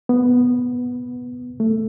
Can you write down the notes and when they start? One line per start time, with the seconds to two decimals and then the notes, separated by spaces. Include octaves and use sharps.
0.09 B3
1.60 A3